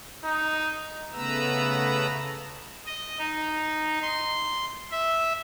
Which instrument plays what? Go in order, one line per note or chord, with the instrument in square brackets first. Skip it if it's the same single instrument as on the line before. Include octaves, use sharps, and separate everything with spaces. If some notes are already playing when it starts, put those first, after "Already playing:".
[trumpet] D#4
[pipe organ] C#3 A3 B3 B4 A#5 E6
D#5
D#4
C6
E5